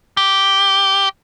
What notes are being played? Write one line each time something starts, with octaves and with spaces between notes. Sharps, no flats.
G4